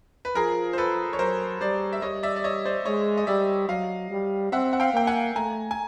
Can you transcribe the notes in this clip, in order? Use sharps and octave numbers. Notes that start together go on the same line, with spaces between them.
B4
F3 G#4 A#4
C5
A4 B4
C#5
F#3 A#4 C5
G3 C5 D5
E5
G3 C#5 D#5
D5 E5
D5
C#5 D#5
C5 D5
G#3 C#5 D#5
D#5
G3 D5 E5
F#3 D#5 F5
G3
C4 E5 F#5
F#5
F5 G5
A#3 G5
F#5 G#5
A3 G#5 A#5
G#5